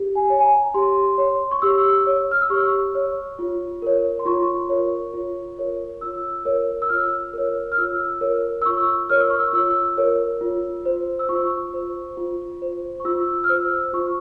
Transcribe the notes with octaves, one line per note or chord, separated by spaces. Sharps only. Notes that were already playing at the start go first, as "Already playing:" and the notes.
Already playing: G4
G#5
C#5
G#5
A#5
G4 C6
C#5
C#6
G4 E6
C#5
F6
E6
G4 C#6
C#5
F4
A#4 C#5
C6
F4 C#6
A#4 C#5
F4
A#4 C#5
F4 E6
A#4 C#5
E6
F4 F6
A#4 C#5
F6
F4 E6
A#4 C#5
E6
F4 C#6
A#4 C#5 F6
E6
C#6
E6
F4 E6
A#4 C#5
F4
C5
E6
F4 C#6
C5
F4
C5
C#6
F4 E6
F6
C5 E6
F4 C#6